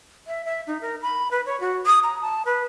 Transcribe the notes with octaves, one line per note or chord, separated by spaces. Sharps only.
E5
E5
D#4
A#4
B5
B4
C#5
F#4
D#6
A#5
A5
B4